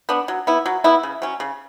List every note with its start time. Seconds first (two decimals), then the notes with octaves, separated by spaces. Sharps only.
0.09 B3 D4
0.28 F#3
0.47 B3 E4
0.66 F#3
0.84 B3 E4
1.03 C#3
1.22 F#3 C#4
1.40 C#3